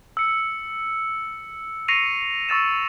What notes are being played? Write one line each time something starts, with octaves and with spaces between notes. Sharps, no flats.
E6 C#7
C#6 A#6 C7 C#7 D#7 F7
C#6 E6 A6 E7